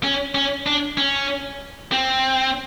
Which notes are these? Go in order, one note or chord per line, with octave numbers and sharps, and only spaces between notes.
C#4
C#4
D4
C#4
C4